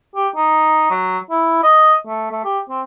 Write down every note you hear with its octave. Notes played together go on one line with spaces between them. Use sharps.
G4
D#4
F#3
E4
D#5
A3
A3
G4
C4